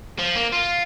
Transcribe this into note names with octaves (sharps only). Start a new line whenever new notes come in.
F3
A#3
F4